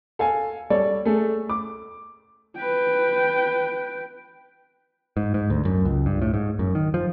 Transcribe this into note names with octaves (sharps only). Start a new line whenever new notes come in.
A4 F5 G#5
G3 A4 C#5 D5
A3 G#4 A4
D6
B4 G5
G#2
G#2
D2
F#2
C#2
G2
A2
G#2
F#2
D#3
F3